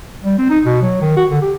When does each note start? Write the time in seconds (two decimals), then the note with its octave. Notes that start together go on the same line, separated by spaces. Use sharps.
0.24 G3
0.38 C4
0.50 D#4
0.65 B2
0.82 F#3
1.02 D#3
1.17 F#4
1.30 D3
1.42 G4